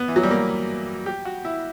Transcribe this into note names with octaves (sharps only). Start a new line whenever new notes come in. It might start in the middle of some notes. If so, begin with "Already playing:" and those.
Already playing: B3
E3
F#3
G3
A#3
G4
F#4
E4